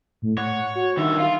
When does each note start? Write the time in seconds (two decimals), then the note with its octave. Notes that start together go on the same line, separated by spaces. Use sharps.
0.22 A2
0.38 C#5 F#5
0.76 F#4
0.97 G2 D#3 E5
1.19 F4